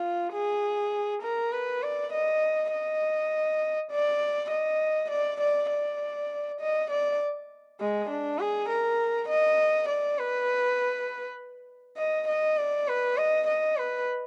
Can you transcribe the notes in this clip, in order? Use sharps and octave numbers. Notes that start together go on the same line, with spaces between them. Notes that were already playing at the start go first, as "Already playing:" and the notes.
Already playing: F4
G#4
A#4
B4
D5
D#5
D#5
D5
D#5
D5
D5
D5
D#5
D5
G#3
D4
G#4
A#4
D#5
D5
B4
D#5
D#5
D5
B4
D#5
D#5
B4